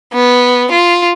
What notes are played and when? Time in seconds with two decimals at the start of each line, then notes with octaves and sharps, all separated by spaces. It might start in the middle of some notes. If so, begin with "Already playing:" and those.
0.14 B3
0.71 F4